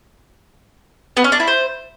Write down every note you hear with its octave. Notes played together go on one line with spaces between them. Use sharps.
B3
C#4
D4
E4
C5